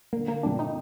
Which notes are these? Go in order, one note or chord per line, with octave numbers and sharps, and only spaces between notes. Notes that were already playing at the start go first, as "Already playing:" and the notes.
D3 A#3
A#3
F3 C4 D4
D#4